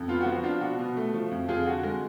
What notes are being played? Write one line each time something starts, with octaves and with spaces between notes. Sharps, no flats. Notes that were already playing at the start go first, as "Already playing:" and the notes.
Already playing: F2
B3 F4
F#4
F3
F#4
D4 F4
B2 F#4
B2
A3
F3
F2
F2 F4 G#4
D3 F#4
G#3